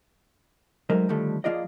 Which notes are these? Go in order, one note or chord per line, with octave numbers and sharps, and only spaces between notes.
F#3 G#3 A3 D#4 A#4 C5
D3 D#3 F3 G3 A3 A4
F3 A#3 F4 G#4 D5 D#5